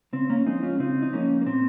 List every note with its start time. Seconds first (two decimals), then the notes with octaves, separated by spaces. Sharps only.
0.13 C#3 C4
0.30 A#3 C#4
0.46 F3 G#3 C4 D#4
0.63 C#4 F4
0.79 C#3 C4 D#4
1.02 D#4
1.13 F3 G#3 A#3 C#4
1.41 A#3
1.46 A#2 C4